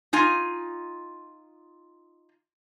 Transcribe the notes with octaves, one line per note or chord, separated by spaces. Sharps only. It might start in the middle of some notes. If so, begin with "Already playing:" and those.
D#4 F4 G#5